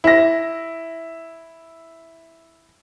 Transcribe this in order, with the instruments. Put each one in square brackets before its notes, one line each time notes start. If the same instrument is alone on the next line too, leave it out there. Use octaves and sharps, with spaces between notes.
[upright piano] E4 A#6